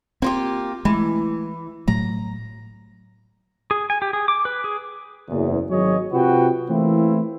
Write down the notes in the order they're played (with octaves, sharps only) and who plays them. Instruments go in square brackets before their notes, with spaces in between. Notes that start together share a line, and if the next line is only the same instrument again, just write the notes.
[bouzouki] A#3 F4 G4 [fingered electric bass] C4
[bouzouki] E3 [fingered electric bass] G#3 A3
[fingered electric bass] A2 F#3 A3 [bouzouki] A#5
[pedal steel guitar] G#4
G#5
G4
G#4
D6
B4
G#4
[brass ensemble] F#1 E2
G#1 F#3 G#3 C#5 D#5
C3 F4 F#4 B4 G5
E3 A3 A#3 C4 E4